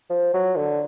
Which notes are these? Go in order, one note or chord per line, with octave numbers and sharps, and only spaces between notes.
F3
F#3
D3